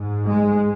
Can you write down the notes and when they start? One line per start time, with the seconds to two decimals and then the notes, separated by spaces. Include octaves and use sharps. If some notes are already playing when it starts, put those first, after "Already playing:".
Already playing: G#2
0.29 G#3